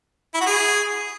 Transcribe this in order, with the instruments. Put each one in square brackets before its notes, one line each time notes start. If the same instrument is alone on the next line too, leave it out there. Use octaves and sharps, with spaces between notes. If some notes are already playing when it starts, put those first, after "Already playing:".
[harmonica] E4
F#4
G#4